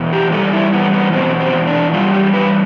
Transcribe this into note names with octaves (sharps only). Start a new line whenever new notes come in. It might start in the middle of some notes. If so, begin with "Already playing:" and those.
Already playing: E2 B2
G4
G3 A4
E4
E2 B3
B3
B2 C4
C4
E2
D4
G3 F4
G4
E2 B4